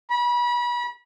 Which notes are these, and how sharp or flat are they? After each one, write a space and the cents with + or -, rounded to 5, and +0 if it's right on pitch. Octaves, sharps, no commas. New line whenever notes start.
B5 -35